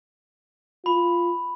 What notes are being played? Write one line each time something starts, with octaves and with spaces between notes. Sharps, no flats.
F4 B5